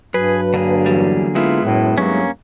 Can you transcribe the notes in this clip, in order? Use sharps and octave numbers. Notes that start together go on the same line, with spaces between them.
G2 F#3 G#4 B4
D3 A#3 G#4
E2 G3
G#3 B3 E4 F4
F#2 A2
G2 F#3 A#3 C#4